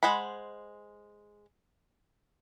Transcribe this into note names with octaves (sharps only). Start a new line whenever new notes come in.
G#3 C5 F#5 B5